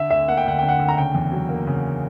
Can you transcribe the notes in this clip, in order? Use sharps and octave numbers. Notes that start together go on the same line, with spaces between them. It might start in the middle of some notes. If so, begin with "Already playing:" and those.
Already playing: D3 E5
D2 E5
A#3 F#5
G5
D2 F#5
D3 G5
F#5
D2
A#5
C#3 G5
E2
F#3
A#3
C#3